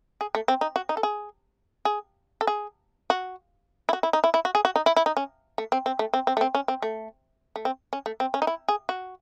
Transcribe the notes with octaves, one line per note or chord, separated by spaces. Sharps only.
G#4
A3
C4
D#4
F#4
D#4
A4
G#4
G#4
A4
G#4
F#4
E4
F#4
E4
D#4
E4
E4
F#4
G#4
F#4
D#4
E4
E4
D#4
C#4
A3
C4
C4
A3
C4
C4
A3
C4
C#4
C4
A3
A3
C4
C#4
A3
C4
C#4
D#4
E4
G#4
F#4